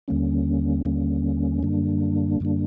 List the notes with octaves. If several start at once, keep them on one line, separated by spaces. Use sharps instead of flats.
D#2 D3 G3 A#3 C#4
D#2 D3 G3 A#3 C#4
F#2 D3 G3 A#3 D4
F#2 D3 G3 A#3 D4